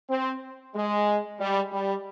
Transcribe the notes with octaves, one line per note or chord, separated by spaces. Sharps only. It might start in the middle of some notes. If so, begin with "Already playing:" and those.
C4
G#3
G3
G3